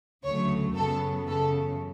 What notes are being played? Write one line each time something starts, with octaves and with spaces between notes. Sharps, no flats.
D2 C#3 F#3 A3 C#5
F#2 C#3 F#3 B3 A4
F#2 C#3 E3 A4